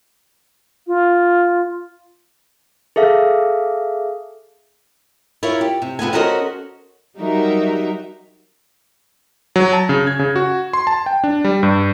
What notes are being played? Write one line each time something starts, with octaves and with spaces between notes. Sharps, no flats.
F4
G#4 A4 E5 F5
E4 F4 A#4 C#5
G4
C3
C3 B3 F4 G#5
C#4 F#4 A4 A#4 C5 D#5
F#3 G3 D#4 F#4 A#4 E5
F#3
A5
C#3
G#6
C#3
F#4
C6
A5
G5
D4
G3
G2